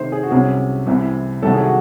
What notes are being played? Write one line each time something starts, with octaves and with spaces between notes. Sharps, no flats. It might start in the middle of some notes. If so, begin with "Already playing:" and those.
Already playing: C3 D#3 A3 D#4 C5
G#4
F#4
C2 C3 F#3 C#4 G#4
C2 C3 E3
C2 C3 D#3 F#3 A3 A4
G#4
F#4